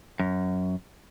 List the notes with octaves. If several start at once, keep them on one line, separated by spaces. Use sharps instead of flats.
F#2